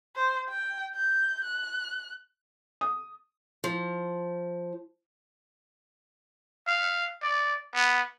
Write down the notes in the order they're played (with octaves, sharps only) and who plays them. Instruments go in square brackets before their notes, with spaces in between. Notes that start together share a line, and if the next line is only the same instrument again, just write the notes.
[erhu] C5
G5
G6
F#6
[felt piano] D#6
[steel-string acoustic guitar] F3
[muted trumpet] F5
D5
B3